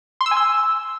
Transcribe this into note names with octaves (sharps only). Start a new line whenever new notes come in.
C6
E6
G#5
E6